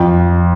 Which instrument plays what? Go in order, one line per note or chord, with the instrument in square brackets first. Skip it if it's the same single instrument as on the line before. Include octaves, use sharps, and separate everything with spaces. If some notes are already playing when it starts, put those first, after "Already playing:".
Already playing: [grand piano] F2